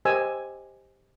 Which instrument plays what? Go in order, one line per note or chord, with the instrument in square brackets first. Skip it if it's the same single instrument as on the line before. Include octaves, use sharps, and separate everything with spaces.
[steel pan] G4 A#4 C5 D#5 G#5 E6